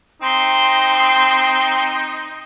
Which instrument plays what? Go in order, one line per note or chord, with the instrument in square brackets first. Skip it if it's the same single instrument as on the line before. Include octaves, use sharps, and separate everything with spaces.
[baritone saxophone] C4 [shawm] D#4 [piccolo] C6